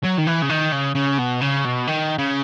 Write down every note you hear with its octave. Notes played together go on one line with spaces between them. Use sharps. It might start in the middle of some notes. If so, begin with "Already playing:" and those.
F#3
D#3
E3
C#3
D#3
C#3
C#3
B2
C#3
B2
D#3
C#3